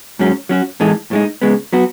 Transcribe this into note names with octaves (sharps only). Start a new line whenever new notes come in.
G#2 F#3 C#4
F#3 C#4 F#4
A2 E3 G#3 D#4 A4
A2 G#3 D#4
C#3 G#3 B3
F#3 B3 F#4